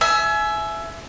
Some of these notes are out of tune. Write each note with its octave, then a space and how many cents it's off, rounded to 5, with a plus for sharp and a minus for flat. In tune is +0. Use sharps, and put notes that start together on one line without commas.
E5 +10 G#5 +30 E6 -45